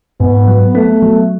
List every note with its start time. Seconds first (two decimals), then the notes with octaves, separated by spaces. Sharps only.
0.20 G#2 B3
0.48 F#3
0.75 A3 B3
1.02 F#3